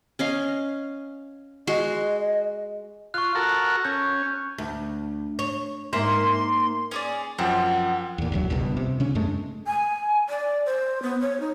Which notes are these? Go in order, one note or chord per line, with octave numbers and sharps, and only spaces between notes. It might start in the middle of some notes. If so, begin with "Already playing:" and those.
C#4 D#5 F5
G#3 F#4 D#5 C6
F4 C#6 F#6
F#4 A4 A#4
C#4 G6
D2
C#5
G#2 A#3 E5 C6
C#4 G#4 D5
F#2 F3 C4 F#5
E2 A#2
F1 D2 F#3
G1 C#2 G2 B2
C3
C#3 C#4 D4
F#2 G#3 A3
G#5
D5
C5
B3
C#5
D#4